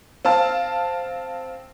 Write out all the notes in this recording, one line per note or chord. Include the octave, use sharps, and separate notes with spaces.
C4 F5 A5